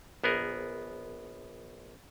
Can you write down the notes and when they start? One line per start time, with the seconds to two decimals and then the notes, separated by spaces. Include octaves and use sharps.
0.24 A#1 B3 G#4 A#4